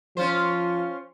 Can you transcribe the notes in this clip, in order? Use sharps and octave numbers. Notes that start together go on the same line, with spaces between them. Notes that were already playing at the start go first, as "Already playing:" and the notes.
F3 C#4 F4 C5